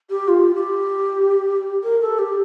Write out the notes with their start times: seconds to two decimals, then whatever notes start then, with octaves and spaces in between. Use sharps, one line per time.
0.10 G4
0.28 F4
0.54 G4
1.84 A#4
2.01 A4
2.19 G4